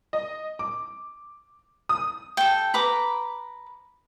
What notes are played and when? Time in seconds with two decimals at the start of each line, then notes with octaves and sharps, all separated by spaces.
0.13 D#5
0.59 D6
1.89 D#6
2.37 A4 G5
2.74 B4 A#5 D6